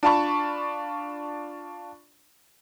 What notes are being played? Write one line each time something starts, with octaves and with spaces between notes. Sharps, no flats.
D4 F4 A5 B5 C#6